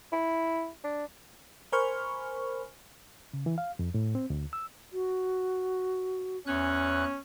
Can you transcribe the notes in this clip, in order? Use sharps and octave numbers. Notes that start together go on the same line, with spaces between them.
E4
D4
A#4 C5 G#5 B5 C#6 F6
C#3
E3
F5
F2
A2
C4
D2
E6
F#4
E2 C#4 F#6